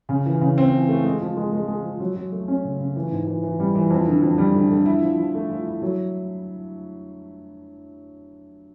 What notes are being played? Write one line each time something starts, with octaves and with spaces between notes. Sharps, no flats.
C#3
E3
C#3
C4
E3
A3
G#3
F3
G#3
G#3
G#3
F3
F#3
F#3
A3
C#4
C#3
C#3
E3
G#2
E3
E3
G3
E3
F2
D3
F2
G3
D3
D3
E4
F3
F3
A3
F3
E4
F#3